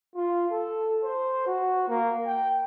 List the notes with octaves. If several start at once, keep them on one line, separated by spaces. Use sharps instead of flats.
F4
A4
C5
F#4
A#3
G5